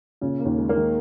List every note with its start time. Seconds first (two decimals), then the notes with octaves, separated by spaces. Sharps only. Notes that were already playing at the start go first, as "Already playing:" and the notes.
0.21 A#2 C#3
0.39 A#3
0.45 D#2
0.58 G#3
0.69 A#3
0.76 D#3